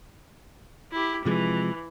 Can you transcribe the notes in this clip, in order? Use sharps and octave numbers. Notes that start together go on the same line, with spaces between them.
E4 G4
C3 E3 F3 G#3